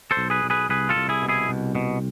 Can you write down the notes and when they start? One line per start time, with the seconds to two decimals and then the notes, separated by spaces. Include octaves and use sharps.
0.11 A4 C5
0.17 B1
0.30 G#4 B4
0.44 B1
0.50 G#4 B4
0.69 C2 G#4 B4
0.89 F4 A4
0.96 C2
1.09 E4 G#4
1.22 B2
1.28 E4 G#4
1.49 C2
1.75 B2